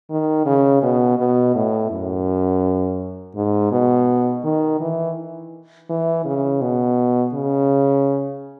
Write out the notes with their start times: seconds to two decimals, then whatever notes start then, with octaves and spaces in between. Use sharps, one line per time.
0.10 D#3
0.46 C#3
0.83 B2
1.18 B2
1.55 A2
1.91 F#2
3.36 G#2
3.72 B2
4.44 D#3
4.81 E3
5.90 E3
6.25 C#3
6.61 B2
7.34 C#3